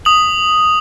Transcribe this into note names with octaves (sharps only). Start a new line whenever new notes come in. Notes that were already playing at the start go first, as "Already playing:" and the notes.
D#6 F#7